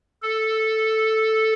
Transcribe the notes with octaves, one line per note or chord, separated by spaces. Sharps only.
A4